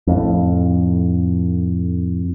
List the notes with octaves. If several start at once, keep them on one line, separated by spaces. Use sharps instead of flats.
F2 A2